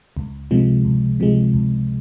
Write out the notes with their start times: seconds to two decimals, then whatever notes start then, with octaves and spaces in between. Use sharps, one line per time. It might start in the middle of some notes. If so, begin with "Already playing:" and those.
0.17 C#2
0.51 C3 F3 G#3
0.85 C#2
1.20 C3 F3 G#3
1.54 C#2